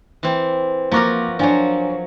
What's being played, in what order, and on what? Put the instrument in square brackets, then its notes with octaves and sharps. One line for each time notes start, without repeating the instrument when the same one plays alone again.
[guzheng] E3 C4
[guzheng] F3 F#4 A#4 [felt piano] A#3 A#5 D6
[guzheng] F3 F#3 [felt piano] D4 G#5